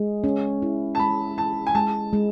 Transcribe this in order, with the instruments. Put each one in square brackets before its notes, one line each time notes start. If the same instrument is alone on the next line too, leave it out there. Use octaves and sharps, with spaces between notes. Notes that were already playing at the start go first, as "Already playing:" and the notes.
Already playing: [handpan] G#3
C#4
E4
[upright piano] A5
[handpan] G#3 [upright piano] B5
[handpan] E4 [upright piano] A5
[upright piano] G#5
[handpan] G#3 [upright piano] A5
[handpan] G#3